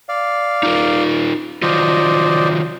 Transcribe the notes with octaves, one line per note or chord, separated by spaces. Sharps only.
D5 F5
D#4 F4 A#4
D#3 F#3 F4 C5 D5 D#5